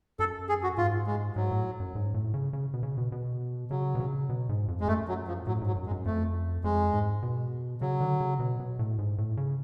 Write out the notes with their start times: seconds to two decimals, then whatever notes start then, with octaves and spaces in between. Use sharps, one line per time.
0.19 F#2 A4
0.49 G#4
0.63 F#4
0.78 G#2 F4
1.07 G#3
1.36 G#2 F#3
1.51 A2
1.80 F#2
1.95 G#2
2.14 A2
2.34 C#3
2.53 C#3
2.74 B2
2.83 C#3
2.98 B2
3.12 B2
3.71 C#3 F#3
3.95 B2
4.00 C#3
4.29 B2
4.49 G#2
4.68 F2
4.80 G#3
4.88 F#2 A3
5.08 F#3
5.27 F3
5.47 A2 F#3
5.62 G#2 F#3
5.76 F#2
5.86 G#3
5.91 F#2
6.05 F2 A3
6.64 F2 G#3
6.94 G#2
7.23 B2
7.81 C#3 F#3
8.01 D3
8.20 C#3
8.39 B2
8.60 B2
8.79 A2
8.99 G#2
9.18 A2
9.37 C#3